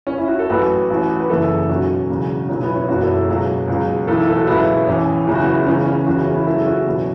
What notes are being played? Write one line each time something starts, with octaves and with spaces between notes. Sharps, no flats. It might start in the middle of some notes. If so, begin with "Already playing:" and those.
C#4
E4
F#4
A4
A1 A2 F#3 F#4 B4
A1 A2 E3
B4
F#1 E2 C#3 E3 E4 A4
B1 B2 F#3 C#4 F#4
E1 E2 C#3 F#3
B1 B2 F#3 C#4
B3 E4
C#4
F#1 E2 B2 F#3 C#4 F#4
E4 A4
C#2 B2 F#3
C#2 B2 F#3
B1 A2 E3 E4 A4
A4
F#4
C#2 B2 F#3 B3 E4
A1 A2 E3 C#4
E2 C#3 F#3 E4
F#4
B3 E4
C#2 C#3 E3 C#4
C#4
E2 C#3 E3 F#4
E4
C#4
B3 E4
C#2 C#3 F#3 E4 A4
C#4 F#4
E2 B2 F#3